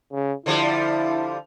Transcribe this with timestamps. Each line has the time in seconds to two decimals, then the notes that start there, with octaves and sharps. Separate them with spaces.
0.12 C#3
0.46 D3 F3 G3 E4